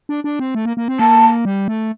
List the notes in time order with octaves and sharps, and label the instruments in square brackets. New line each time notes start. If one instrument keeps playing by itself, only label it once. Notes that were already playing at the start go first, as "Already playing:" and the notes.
[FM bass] D4
D4
C4
A3
A#3
A#3
C4
[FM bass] A#3 [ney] A5
[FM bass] G3
A3